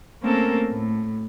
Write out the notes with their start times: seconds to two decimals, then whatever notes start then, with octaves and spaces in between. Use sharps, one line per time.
0.21 A3 A#3 C4 C#4 A4 A#4
0.69 A2